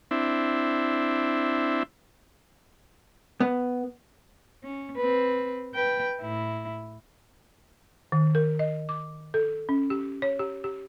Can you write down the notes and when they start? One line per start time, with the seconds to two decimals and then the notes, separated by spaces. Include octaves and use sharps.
0.11 C4 D4 E4
3.40 B3
4.64 C#4
4.97 C4 B4
5.74 B4 G5
6.21 A2 E4
8.12 D#3
8.35 A#4
8.59 D#5
8.89 D6
9.34 A4
9.69 C#4
9.90 G4
10.22 C#5
10.39 G4
10.64 G4